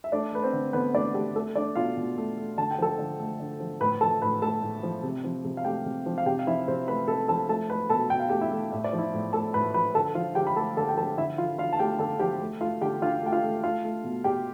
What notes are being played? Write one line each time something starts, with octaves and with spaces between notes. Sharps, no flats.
E5
A3 D4 D5
A3 B4
C4 C5
D3
D3 B3 B4
A3 D4 D5
A3 G4
A3 A4
A3 D4 D5
B2 F4 F5
B2
A3
A3
D3 A5
G5
F3 A4 A5
D3
A3
D3
F3
A2 B4 B5
F3 A4 A5
A2 B4 B5
A3 A4 A5
A2
F3
C3
F3
C3
F5
A3 G4 G5
C3
F3
F5
C3 G4 G5
F5
F3 E4 E5
C3 C4 C5
A3 B4 B5
C3 A4 A5
F3 A4 A5
A3 A4 A5
A3 B4 B5
B2 A4 A5
B2 G5
F5
A3 G4 G5
E4 E5
A3
A2 E5
D5
F3
E4 E5
A2
A3 A4 A5
A2 B4 B5
F3 B4 B5
D3 A4 A5
F3 F4 F5
D3 G4 G5
B5
A3 A4 A5
D3 A4 A5
G5
F3 A4 A5
D3 E4 E5
F3 F4 F5
D3 F4 F5
A5
A3 G4 G5
D3 A4 A5
F3 G4 G5
A3
A3 F4 F5
D3 G4 G5
D3 F4 F5
A3 G5
F4 F5
A3
A3 F4 F5
A3
B2
B2 G4 G5